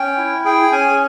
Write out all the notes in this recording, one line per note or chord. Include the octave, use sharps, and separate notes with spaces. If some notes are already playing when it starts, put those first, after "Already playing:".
Already playing: C#4 G5
E4
G#4 G5
C#4 G#5